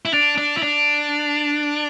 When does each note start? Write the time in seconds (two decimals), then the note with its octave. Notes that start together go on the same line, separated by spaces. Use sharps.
0.05 E4
0.13 D4 A6 D7 F7
0.38 D4
0.57 E4
0.63 D4